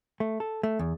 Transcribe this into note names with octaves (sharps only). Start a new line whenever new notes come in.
A3
A4
A3
E2